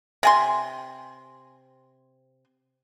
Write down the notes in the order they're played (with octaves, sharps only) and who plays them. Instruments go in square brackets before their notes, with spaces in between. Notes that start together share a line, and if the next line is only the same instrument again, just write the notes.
[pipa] C3 G#5 C6